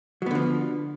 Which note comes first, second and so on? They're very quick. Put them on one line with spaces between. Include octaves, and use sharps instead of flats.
F#3 B3 D3 F3